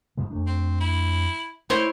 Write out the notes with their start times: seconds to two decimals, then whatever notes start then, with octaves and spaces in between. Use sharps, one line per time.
0.17 G#2 F3 G3
0.30 F2 A3 D4
0.46 C4
0.80 E4
1.70 A3 D#4 E4 C5 C#5